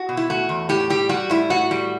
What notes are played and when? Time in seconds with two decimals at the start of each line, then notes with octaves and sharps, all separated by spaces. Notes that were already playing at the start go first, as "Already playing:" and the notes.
Already playing: F#4
0.09 B2
0.17 E4
0.30 A3 F#4
0.49 E2
0.69 A2 G4
0.90 G3 G4
1.09 G3 F#4
1.30 A2 E4
1.50 A2 F#4
1.71 G3